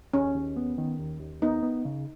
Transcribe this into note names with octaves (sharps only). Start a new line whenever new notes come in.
D#2 C#4
D#2
B3
D#3
D#2
D#2
B3 D#4
B3
C#3